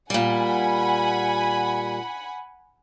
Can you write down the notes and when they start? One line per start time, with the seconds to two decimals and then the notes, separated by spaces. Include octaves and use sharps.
0.10 A#2 G3 F#5 G#5 B5